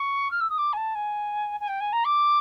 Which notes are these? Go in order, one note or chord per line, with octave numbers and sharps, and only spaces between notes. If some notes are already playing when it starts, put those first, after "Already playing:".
Already playing: C#6
F6
E6
D#6
D6
G#5
A5
G#5
G#5
G5
G#5
A#5
D6